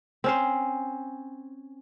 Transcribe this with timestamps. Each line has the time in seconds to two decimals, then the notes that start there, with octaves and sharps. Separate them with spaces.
0.24 C4 C#4 C5